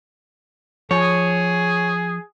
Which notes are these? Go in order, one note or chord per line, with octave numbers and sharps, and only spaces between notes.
F3 G#4 C#5